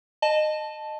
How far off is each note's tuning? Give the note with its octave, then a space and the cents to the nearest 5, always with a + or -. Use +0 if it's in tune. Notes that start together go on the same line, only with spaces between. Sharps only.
D#5 -20 A5 -5